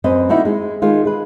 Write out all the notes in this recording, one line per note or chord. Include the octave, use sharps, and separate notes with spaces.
F#2 C4 B4 D#5
D#3 A#3 D#4 E4 F#4
G#3
D#3 G#3 F4
G#3 B4